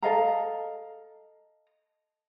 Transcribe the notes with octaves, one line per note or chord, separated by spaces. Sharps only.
A4 D#5 F5 A#5